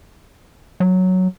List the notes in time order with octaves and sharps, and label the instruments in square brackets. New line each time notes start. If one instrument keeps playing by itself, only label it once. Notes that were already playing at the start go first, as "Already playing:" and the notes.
[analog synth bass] F#3